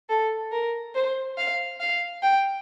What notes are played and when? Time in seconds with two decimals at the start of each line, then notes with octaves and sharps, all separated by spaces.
0.09 A4
0.52 A#4
0.95 C5
1.37 F5
1.80 F5
2.22 G5